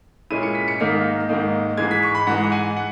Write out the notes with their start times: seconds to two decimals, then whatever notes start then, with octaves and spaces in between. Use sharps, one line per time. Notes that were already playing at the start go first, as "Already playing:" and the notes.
0.30 A#2 G#3 C#4 E4 D#7
0.43 C#7
0.55 B6
0.68 C#7
0.80 G#2 D#3 A#3 D#4 B6
1.29 G#2 D#3 A#3 D#4
1.77 G#2 E3 G#3 G#6
1.91 B6
2.03 C#6
2.15 B5
2.27 G#2 E3 G#3 F#5
2.44 F#5
2.52 G#5
2.77 F#5